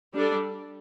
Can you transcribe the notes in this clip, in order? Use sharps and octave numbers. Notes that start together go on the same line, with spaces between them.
G3 D4 A4 D5